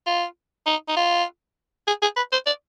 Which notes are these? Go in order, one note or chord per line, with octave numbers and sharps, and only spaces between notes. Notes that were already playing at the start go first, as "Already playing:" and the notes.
F4
D#4
D#4
F4
G#4
G#4
B4
C5
D5